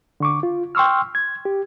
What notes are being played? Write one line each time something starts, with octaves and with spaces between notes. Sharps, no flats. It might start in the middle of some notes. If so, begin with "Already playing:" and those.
D3 C#6 D6
F4
G5 C6 C#6 E6 F6
G#6
G4